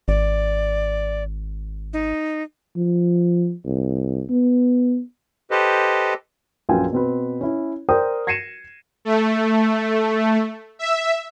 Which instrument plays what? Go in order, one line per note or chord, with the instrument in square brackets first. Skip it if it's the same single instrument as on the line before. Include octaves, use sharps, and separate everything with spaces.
[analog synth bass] G#1 [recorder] D5
[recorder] D#4
[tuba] F3
C2
B3
[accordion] G4 A4 B4 C5 D#5
[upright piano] A#1 F#2 F4 B4 G5 G#5
B2 C4 B4
C#4 E4
A#4 C5 D5 G5 D#6
G#6 A#6 C7 C#7 D#7 E7
[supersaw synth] A3
E5